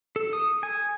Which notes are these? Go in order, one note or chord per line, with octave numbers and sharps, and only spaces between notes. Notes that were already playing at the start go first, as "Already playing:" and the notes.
A4
D#6
G#5